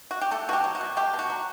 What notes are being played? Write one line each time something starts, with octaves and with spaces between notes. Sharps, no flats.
F#4
G4
A3 A4
B2 F#4 G4
F#3
F#4
B2
A3 G4
B2
F#4
F#3